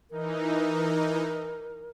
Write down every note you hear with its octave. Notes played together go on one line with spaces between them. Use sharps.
E3 D#4 A#4